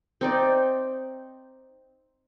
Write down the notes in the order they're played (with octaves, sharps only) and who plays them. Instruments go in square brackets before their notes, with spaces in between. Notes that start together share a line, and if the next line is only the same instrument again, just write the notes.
[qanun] C4 D#4 D5